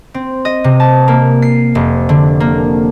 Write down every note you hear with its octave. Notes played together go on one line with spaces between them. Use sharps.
C4
D#5
C3
A5
A#3
C7
F1
D3
A#3